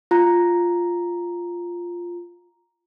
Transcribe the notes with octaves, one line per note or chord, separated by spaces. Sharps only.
F4 A#5